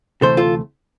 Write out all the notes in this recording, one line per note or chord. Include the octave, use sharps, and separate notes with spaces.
D2 C3 E3 A3 A4 C5
F4 A4